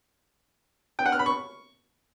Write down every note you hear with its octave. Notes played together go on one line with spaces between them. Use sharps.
G5
F#5
F6
B5
C#6